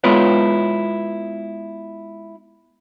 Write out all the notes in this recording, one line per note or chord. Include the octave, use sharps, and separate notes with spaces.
G#3 B3 E4 F4 B4 C#5